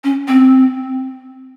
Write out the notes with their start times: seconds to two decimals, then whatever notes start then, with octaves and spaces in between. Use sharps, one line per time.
0.04 C#4
0.28 C4